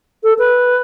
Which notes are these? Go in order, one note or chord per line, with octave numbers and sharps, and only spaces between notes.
A4
B4